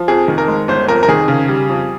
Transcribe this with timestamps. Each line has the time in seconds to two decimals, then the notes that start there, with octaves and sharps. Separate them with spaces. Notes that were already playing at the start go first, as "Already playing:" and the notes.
Already playing: F3
0.08 F2 G#4
0.28 D#3
0.38 A#4
0.48 G#3
0.68 G1 C5
0.88 F2 A#4
1.03 A#4
1.08 D#3 G#4
1.28 C#3
1.48 G3
1.69 F2